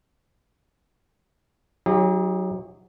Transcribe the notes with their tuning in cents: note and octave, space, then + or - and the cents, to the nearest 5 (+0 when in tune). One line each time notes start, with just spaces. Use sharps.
F#3 +0 D#4 +35 G4 +45